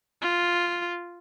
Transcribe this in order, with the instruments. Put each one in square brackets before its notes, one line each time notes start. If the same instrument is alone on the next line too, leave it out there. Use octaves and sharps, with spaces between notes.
[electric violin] F4